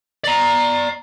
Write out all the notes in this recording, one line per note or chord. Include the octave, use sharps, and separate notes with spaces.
D5 A#5